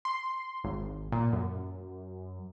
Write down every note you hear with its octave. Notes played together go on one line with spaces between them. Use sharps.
C6
G#1
A#2
F#2